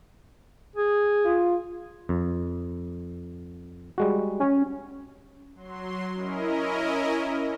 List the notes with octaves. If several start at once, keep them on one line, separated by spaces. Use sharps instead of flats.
G#4
F4
F2
G3 G#3 F#4
C#4
F#3 C6
C#4 E4 A#4 D#5